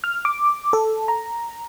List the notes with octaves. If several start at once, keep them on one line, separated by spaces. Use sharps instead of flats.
F6
D6
A4
A#5